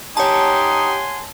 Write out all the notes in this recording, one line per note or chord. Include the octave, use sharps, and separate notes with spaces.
D#4 G4 C#5 F#5 G#5 A5 C6